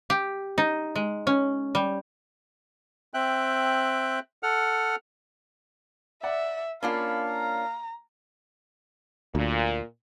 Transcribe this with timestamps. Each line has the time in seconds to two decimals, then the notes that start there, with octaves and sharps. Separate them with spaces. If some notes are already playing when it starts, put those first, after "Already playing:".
0.10 G4
0.58 D#4
0.96 G#3
1.27 C#4
1.75 G3
3.14 C4 E5 G5 F#6
4.43 A4 F#5 F6
6.23 D5 E5 F#5
6.83 A#3 C#4 D4 F4 F5 B5
7.31 A#5
9.35 D2 A#2